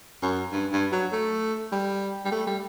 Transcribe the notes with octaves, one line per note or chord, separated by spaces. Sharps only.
F#2
G2
G2
F#3
A3
G3
G3
A3
G3